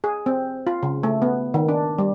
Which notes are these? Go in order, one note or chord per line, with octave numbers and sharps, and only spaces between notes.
G#4
C4
F4
C#3
A3
B3
D#3
D4
G3